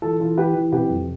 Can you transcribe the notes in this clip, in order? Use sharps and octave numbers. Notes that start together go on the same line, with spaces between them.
E3 F4 A4
E3 F4 A4
E3 G4 B4
E3
C3 G4 B4
F2